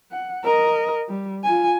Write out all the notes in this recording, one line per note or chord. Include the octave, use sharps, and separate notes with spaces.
F#5
A#4 D#5
G3
F4 G#5